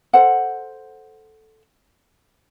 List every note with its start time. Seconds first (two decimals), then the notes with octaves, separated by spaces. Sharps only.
0.13 A4 C5 F#5